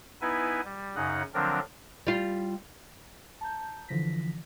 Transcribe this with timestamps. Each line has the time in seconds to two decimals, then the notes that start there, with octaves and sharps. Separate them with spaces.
0.21 B3 D#4 E4 B4 G#5
0.65 G3
0.95 F#2 C#3 D#4 F#5
1.34 D3 F3 F#3 C4 D4 A#4
2.07 G3 F4
3.41 A5 A#5 G6
3.89 D3 E3 F3 A#6 B6